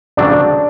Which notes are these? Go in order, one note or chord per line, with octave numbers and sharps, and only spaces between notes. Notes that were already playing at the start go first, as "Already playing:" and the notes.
C#3 F#3 A3 C4 D4